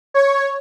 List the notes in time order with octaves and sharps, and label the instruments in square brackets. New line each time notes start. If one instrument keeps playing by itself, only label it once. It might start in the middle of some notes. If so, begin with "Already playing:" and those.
[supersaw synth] C#5